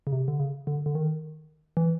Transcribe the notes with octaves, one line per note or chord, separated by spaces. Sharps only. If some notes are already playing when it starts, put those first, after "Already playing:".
C#3
C3
D3
C#3
D3
D3
D#3
E3